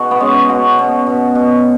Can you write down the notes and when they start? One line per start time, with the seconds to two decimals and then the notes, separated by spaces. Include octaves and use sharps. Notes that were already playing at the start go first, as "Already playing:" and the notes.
Already playing: B2 D#4 F#4 G#4
0.11 B3
0.20 G#3 C#4
0.49 B2 F#4
0.79 B2
1.06 B2
1.35 B2